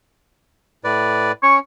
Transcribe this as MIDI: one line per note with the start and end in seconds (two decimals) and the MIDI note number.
0.84 1.32 45
0.84 1.32 71
0.84 1.32 74
1.43 1.59 61
1.43 1.56 85